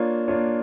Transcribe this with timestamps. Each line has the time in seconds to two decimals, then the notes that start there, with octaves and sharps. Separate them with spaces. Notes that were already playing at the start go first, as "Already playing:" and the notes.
Already playing: A#3 D4 F4 C#5
0.28 A#3 D4 F4 C#5